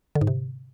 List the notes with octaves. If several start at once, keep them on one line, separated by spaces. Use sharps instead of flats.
D3
G#2
C3